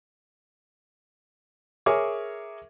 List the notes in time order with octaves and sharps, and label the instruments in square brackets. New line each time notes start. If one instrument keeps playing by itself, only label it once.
[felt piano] G#4 A#4 C#5 E5 D6